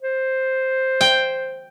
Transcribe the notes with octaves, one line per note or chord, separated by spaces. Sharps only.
C5
G5